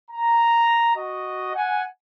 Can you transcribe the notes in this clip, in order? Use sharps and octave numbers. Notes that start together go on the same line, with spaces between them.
A#5
F#4 D#5
F#5 G#5